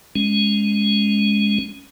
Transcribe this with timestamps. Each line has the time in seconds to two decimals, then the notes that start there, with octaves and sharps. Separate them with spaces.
0.15 G#3 C#4